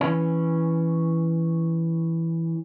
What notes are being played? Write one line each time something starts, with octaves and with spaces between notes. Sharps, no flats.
E3 C#4